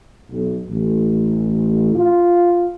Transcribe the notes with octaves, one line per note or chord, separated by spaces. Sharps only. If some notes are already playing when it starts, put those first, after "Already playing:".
B1
A1
F4